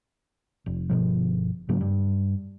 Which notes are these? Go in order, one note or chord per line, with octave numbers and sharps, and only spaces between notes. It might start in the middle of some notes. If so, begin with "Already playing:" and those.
F1
G1 B2 F3
G#2 C#3 F#3 A#3
G2